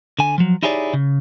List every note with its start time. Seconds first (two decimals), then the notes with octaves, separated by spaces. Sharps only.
0.19 D3 G#5
0.38 F3 F#3
0.63 D#4 E4 G4 G#4 C#5 D5
0.93 C#3